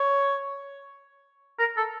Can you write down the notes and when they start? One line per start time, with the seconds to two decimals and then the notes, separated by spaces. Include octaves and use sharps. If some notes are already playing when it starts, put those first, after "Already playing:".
Already playing: C#5
1.59 A#4
1.77 A4